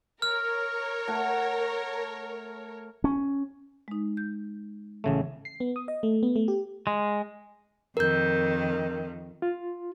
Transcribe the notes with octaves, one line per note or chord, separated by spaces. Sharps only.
A#4 C#5 F6
A3 F#5
C#4
G#3 D#4
G6
A1 C#3 A3
C7
B3
D#6
D#5
A3
B3
A3
G4
G#3
F2 D#3 A#4 G6
F4